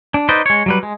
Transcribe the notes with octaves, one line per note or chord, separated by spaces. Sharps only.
D4
D#4 B4 C5 D5 D#5
G#3 C#5
F#3 G3 B4
G#3